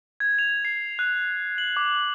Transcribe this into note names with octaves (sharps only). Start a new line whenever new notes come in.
G#6
F7
C7
F#6
F#7
D6